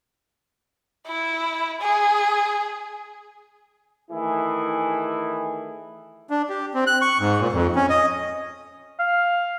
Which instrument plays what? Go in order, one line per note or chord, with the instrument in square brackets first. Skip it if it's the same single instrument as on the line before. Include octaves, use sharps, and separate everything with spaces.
[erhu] E4
G#4
[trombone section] D#3 E3 A3 E4 G#4
[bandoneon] D4
G4
C4
F#6
C#6
G#2
A#2
F2
C#4
D#5
[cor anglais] F5